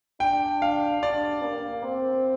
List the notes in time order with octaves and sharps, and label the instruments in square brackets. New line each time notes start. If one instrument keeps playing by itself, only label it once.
[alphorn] D4 [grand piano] G5
[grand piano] F5
[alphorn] D4 [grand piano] D5
[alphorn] A#3
C4